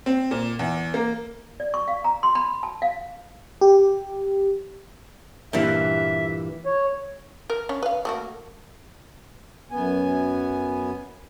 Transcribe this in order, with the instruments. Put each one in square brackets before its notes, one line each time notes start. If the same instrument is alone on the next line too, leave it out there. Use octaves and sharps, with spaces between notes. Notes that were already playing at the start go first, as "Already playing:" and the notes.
[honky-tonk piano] C4
A#2
E2
A#3
[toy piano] D5
C#6
F5
A#5
C6
B5
A5
F5
[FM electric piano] G4
[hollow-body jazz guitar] G2 A#2 E3 [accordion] E5
[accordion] C#5
[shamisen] A#4
C#4 C#5
B4 F5
A3 A#3 F#4
[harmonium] F#2 B3 G#5